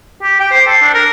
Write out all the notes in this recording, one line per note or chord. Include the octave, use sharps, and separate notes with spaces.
G4
G5
C5
A4
D4
A#4